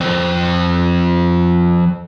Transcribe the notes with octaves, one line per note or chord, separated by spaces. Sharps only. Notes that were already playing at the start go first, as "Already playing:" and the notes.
F2 C4